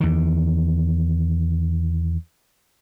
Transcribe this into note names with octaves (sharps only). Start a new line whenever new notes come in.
E2 D#3